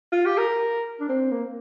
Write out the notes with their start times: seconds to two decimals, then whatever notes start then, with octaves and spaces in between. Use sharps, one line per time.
0.12 F4
0.26 G4
0.38 A#4
1.00 D4
1.09 C4
1.32 A#3